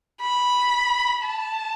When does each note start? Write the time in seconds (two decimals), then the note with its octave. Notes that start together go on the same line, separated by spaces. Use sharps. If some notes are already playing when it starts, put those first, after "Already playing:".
0.22 B5
1.23 A5